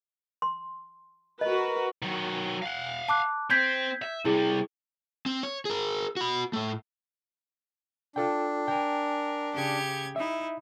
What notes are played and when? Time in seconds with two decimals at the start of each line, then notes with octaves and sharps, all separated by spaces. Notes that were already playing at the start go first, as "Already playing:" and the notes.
0.42 C6
1.41 F#4 A#4 B4 D#5
2.02 D#3 F#3
2.62 F5 F#5
3.09 A5 D6 F#6
3.50 C4 G6 G#6 B6
4.02 E5
4.25 C3 G3 E4 G#4
5.26 C4
5.43 C#5
5.65 G#4 A#4
6.17 F#4 B5
6.53 A2 A3
8.16 D4 F4 A4 G5
8.68 A#4 G5 G#5
9.54 C#3 G4 G#6
10.16 D#4 E4 E5